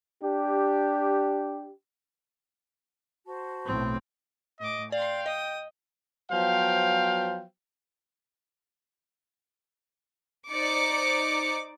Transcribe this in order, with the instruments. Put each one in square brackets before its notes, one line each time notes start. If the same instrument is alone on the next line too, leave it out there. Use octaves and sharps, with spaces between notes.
[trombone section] D4 G4
[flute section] F#4 C5 A5
[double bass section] B1 A2 [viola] C4
[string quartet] A2 D6 [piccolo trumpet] D#5
[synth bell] D5 [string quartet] F5 C6 [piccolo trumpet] G5
[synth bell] D#5 [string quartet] D#6
[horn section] F3 F#3 B3 C5 F5 G5
[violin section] D#4 C5 D5 D6 C#7